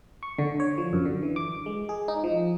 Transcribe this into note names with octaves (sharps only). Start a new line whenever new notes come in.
C#6
D3
C#5
F3
F#2
D3
E3
D6
G#3
G#4
D#4
F3